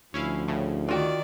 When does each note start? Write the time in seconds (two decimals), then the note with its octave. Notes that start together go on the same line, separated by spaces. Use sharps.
0.14 D2 F3 C#4 E4 F5
0.48 A2 C#3
0.89 D#3 F4 F#4 D5 G5